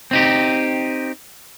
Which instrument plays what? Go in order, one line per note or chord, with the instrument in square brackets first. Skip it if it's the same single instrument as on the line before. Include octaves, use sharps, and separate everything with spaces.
[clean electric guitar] C4 D#4 G4